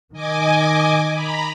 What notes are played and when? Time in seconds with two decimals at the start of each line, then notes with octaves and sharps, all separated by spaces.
0.13 D#3 D#5 G#5 D6
1.13 A#5 B5